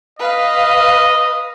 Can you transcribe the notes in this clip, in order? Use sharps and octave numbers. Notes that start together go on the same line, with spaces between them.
B4 D#5 F5